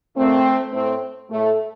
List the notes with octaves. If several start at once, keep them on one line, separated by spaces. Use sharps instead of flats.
A#2 A3 C4
A2 A3 C4
A2 A3